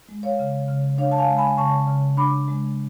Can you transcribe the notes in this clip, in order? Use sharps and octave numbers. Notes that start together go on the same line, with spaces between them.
G#3
C#5 F5
C#3
C#3
D4 C#5 F5
A5
F5 G#5
G#3
G#5 B5
C#3 A5 C#6
C#3
D4 B5 D6
G#3